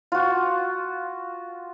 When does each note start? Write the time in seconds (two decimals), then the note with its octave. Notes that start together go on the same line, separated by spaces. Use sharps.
0.12 F4 F#4